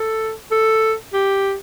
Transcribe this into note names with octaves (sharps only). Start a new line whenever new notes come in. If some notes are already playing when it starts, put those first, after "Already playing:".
Already playing: A4
A4
G4